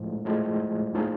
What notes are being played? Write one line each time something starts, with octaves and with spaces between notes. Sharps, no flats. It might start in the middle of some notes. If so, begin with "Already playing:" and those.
Already playing: A2 F3 G#3
A2 F3 G#3
A2 F3 A#3 D#4 G#4